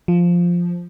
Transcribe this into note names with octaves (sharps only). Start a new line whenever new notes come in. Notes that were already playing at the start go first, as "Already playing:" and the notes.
F3